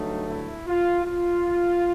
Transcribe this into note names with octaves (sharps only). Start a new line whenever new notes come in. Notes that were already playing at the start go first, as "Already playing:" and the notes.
Already playing: G2 D3 F#3 A3 D#4
E4
F4
F4